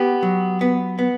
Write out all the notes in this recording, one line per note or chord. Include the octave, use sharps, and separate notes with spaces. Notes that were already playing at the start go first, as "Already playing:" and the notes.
Already playing: B3 G4
F#3
B3
B3